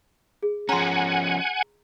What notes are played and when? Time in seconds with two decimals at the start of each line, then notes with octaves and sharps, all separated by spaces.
0.43 G#4
0.69 F3 C#4 F#5 G#5 A#5 C6